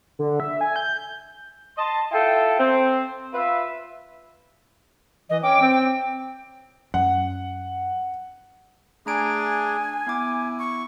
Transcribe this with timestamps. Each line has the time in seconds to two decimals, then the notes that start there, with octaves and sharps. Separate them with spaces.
0.19 D3
0.40 E5
0.61 G#5
0.76 G6
1.78 D#5 A5 C6
2.12 E4 F4 A4 E5 G5
2.59 C4 C5
3.34 F4 B4 E5
5.30 E3 D#5
5.43 C#4 G5 D6
5.61 C4
6.94 F#2 F#5
9.06 A3 D4 G#4 G#5 A#5 D7
10.07 B3 E4 D6
10.59 C#6